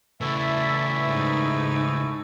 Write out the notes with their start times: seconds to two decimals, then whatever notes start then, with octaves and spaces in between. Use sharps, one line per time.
0.21 C#3 E3 A3 E4 F#4 A4 D5 E5
1.08 G#2 D#4